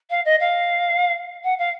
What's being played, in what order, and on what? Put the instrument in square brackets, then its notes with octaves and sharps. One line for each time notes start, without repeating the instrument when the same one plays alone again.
[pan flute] F5
D#5
F5
F#5
F5